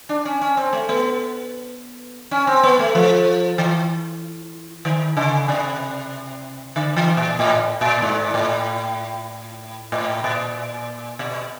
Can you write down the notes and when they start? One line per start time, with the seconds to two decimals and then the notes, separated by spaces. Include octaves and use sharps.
0.09 D4
0.25 C#4
0.41 C#4
0.57 C4
0.73 A3
0.89 B3
2.31 C#4
2.47 C4
2.63 B3
2.79 A3
2.95 F3
3.58 E3
4.85 D#3
5.17 C#3
5.48 C3
6.76 D3
6.96 E3
7.17 A#2
7.39 A2
7.81 A#2
8.02 G#2
8.34 A2
9.92 A2
10.24 A#2
11.19 B2